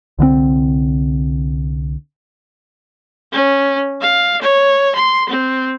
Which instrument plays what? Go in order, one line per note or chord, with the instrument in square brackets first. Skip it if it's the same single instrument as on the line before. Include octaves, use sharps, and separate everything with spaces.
[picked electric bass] C2 D3 F3 C4
[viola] C#4
F5
C#5
C6
C4